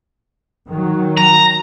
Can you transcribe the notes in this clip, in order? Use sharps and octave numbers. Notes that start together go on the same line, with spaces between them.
D#3 F#3
A#5